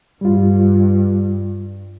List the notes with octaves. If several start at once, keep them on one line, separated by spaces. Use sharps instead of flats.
G2 G3 F4